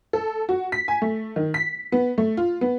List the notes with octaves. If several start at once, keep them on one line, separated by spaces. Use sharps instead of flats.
A4
F#4
B6
G#5
A3
D#3
B6
B3
A3
F4
B3